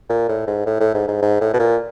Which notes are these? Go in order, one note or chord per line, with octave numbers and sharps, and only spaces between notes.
A#2
A2
G#2
A2
A2
G#2
G#2
G#2
A2
B2
A#2